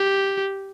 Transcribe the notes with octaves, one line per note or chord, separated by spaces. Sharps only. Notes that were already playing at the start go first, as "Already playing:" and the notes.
Already playing: G4